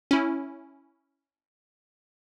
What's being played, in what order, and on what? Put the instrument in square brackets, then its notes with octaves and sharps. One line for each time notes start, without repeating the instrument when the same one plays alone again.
[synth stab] C#4 E4